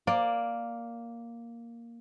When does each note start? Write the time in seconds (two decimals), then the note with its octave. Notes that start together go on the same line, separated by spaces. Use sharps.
0.07 A#3 D5